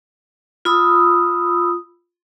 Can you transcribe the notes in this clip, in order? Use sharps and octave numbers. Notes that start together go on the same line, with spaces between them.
F4 B5 D#6 E6